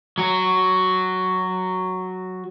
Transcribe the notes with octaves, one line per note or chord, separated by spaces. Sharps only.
F#3 F#4